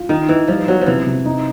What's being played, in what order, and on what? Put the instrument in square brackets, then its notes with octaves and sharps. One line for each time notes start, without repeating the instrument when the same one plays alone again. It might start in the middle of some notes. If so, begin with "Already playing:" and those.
Already playing: [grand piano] F4
[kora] D#3 [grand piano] D#4
[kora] E3 [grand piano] D#4
[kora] F3 [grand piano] G3
[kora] F#3 [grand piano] B3
[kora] F3
[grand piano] C3 [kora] E3
[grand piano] C3
D#4